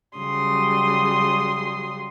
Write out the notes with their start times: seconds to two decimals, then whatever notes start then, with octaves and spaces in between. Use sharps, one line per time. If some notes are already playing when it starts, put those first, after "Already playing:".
0.17 C#3 F#3 G3 C6 D#6